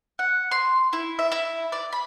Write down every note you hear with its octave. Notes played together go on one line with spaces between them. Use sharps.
F#5
C6
E4
E5
E4
D5
B5